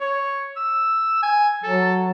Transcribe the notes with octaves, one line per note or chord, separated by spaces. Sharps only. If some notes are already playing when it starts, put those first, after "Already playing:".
C#5
E6
G#5
F#3 A4